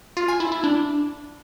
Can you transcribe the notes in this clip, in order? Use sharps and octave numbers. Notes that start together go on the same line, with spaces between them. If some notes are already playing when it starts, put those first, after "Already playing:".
F4
G#5
E4
E4
D4